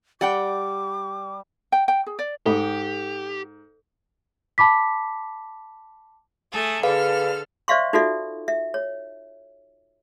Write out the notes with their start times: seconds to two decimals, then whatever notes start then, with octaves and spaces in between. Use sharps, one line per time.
0.21 G3 D5 F#5 G5 D6
1.72 G5
1.88 G5
2.06 G#4
2.19 D5
2.46 G#2 G4 A4
4.58 A5 B5 D6 B6
6.52 A3 G#4 A4
6.83 D3 G#4 A4 B4 F5 F6
7.68 C5 D5 E5 F5 C6 C#6
7.93 D#4 F4 F#4 A4 D5 E5
8.48 E5
8.74 C#5